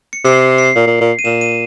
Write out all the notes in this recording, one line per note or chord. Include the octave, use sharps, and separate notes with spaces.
C#7
C3 C7
C7
A#2
A#2
A#2
D#7
A#2 E7
D#7